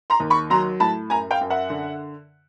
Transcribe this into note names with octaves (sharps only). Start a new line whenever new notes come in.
A#5 C6
D#2
B5 C#6
F#3 A#5 C6
A2 A5 B5
F#2 G#5 A#5
F5 G5
F#2
E5 F#5
D3